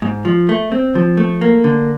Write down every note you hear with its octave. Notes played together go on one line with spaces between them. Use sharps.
G#2
F3
A3
C4
F3
A3
A#3
D3